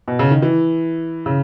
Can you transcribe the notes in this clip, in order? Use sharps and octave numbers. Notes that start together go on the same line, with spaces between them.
B2
C#3
D#3
E3
C#3